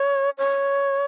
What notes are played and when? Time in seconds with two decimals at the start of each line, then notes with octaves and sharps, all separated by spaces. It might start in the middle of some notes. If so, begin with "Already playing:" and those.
Already playing: C#5
0.38 C#5